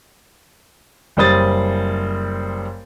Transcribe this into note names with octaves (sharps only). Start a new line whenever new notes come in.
F#1 G3 C5 D#6 A6